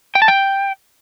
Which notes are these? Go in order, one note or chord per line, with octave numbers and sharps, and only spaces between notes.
G5
A5
G5